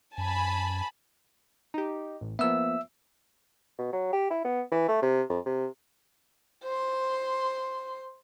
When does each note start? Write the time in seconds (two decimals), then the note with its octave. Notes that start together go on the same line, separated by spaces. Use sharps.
0.18 F#2 G#5 A5 B5
1.74 D#4 G4
2.21 A1
2.39 F3 A#3 B3 E5 E6
3.79 B2
3.93 F#3
4.13 G4
4.31 E4
4.45 B3
4.72 E3
4.89 A3
5.03 C3
5.30 F2
5.46 C3
6.63 C5 C6